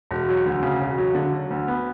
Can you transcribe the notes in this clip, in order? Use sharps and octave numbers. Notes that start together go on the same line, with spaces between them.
E1
F#3
D2
C#3
E1
F#3
D3
F#3
D2
B3